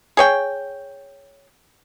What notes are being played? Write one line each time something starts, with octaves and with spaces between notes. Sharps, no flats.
G#4 C#5 G5